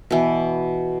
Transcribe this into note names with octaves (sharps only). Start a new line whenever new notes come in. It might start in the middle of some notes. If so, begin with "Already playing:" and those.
B2 E3